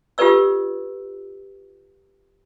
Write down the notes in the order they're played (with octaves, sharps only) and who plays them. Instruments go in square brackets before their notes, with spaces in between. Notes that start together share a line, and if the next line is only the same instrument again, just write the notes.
[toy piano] F4 G4 A4 B4 D5 E6